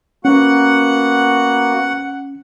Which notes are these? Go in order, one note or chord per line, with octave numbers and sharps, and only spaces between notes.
A#3 B3 C#4 F#4 F#5